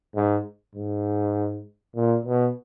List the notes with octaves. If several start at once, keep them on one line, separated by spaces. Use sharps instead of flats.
G#2
G#2
A#2
B2